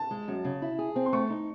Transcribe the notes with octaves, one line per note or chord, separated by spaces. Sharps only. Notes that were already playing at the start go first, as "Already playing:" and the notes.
Already playing: A5
G#3
F#2
C#3
E4
G#4
C4
C6
A3 C#6
D#4